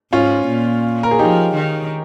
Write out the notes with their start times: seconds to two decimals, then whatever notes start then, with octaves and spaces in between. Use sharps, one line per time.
0.12 G#2 C#4 F4
0.48 A#2
1.03 A#4
1.11 G#4
1.19 F3 D#4 G4
1.55 D#3